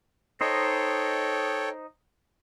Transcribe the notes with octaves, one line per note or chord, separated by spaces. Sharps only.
D#4 A4 C5 C#5 D#5 G5